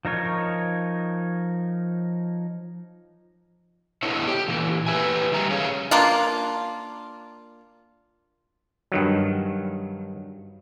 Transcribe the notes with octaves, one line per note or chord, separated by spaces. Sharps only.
F3 D#4 A#4 C#5
D3 B3 D#4 E4 C#5
G4
A#2 E3
G4 B4 E5 G#5
D#3 G3 A#5
A3 C#4 G#4 C#5 F5
A#3 D4 F4
G2 D#3 F#3